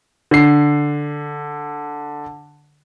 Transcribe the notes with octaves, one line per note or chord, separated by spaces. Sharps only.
D3 C7